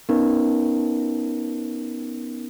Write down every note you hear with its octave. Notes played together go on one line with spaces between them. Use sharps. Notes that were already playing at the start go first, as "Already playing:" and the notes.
B3 C#4 D#4 A#4